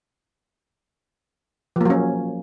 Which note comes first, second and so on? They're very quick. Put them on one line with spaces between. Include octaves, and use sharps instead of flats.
F3 A#3 F#3 C#4